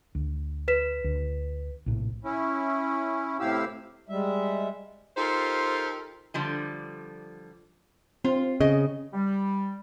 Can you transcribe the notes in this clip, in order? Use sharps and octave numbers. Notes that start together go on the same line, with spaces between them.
D2
B4 B6 E7
D2
A#1 A2 C3
C#4 E4
A2 C3 E4 G4 F5 E6
G3 G#3 E5
D#4 F4 G4 A4 A#4 C5
D3 F3 G3
C4 F4
C#3 D#5
G3